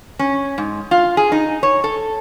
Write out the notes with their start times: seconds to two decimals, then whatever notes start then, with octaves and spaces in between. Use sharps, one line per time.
0.19 C#4
0.58 G#2
0.91 F4
1.17 G#4
1.32 D#4
1.63 C#5
1.84 A4